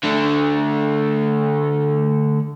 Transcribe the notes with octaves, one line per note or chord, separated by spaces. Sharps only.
D3 A3